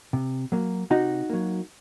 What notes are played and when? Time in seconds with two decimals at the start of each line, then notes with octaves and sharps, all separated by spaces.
0.13 C3
0.52 F#3 A#3
0.90 C3 D#4 F#4
1.30 F#3 A#3